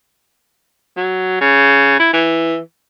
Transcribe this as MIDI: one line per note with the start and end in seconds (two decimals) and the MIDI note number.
0.97 1.39 54
1.41 1.96 49
1.99 2.11 64
2.13 2.59 52